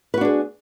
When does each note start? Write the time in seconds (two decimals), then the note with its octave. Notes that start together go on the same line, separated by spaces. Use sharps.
0.14 B4
0.17 F#4
0.21 D4
0.25 G#4